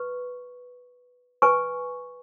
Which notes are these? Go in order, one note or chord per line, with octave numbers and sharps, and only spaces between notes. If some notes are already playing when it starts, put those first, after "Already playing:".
Already playing: B4 C#6
B4 G#5 C#6